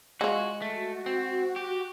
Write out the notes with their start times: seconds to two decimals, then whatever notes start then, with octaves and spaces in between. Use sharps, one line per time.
0.21 G#3 F4 F#4
0.62 A3 F#4
1.06 C4
1.56 G4